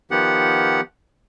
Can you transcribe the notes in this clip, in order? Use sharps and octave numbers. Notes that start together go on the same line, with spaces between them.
D#3 F3 B3 G4 F#5